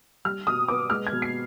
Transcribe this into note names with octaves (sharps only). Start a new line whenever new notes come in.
G3 F6
B2 D#6
B3 D6
G#3 F6
G#6
B2
C7